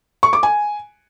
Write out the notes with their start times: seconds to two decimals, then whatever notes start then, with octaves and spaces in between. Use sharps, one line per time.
0.23 C#6
0.33 D6
0.43 G#5